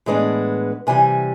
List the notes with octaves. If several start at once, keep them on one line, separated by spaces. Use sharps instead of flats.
A2 E3 G#3 B3 D4
C3 E3 G3 G#5